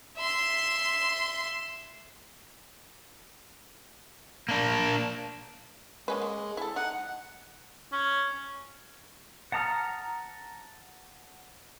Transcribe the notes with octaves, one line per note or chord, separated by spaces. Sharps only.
E5 C6
A#3 D4
G#3 A#3 C#4 B4
A#3
E4 A4
D#4 F#5
C#4
F#5 A5 A#5 D#6 F6